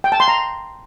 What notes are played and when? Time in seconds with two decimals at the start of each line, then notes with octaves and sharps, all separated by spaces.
0.04 G5
0.12 A5
0.20 C6
0.28 A#5